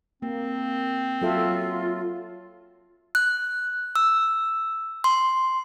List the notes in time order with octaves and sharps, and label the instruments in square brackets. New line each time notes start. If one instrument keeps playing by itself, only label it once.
[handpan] A#3 [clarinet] C4
[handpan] F#3 A4 E5 [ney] F4
[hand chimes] F#6
E6
C6